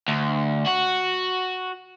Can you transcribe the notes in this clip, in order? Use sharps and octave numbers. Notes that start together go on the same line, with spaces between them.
D2
F#4